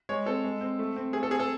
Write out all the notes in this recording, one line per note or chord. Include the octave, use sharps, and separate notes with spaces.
G#3 C#5
C4 A4
G#3
C4
A3
C4
A3 G#4
A4
C4 G#4
A4